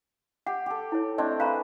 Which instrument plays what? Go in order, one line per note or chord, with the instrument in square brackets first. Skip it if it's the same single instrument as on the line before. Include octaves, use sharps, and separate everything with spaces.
[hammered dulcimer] G4 [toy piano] F#5
[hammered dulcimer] G4 A4
[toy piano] E4 C#5
[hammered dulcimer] A3 C4 D4 [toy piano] D5 D#5
[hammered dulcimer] G#4 B4 [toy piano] F5 A#5 C#6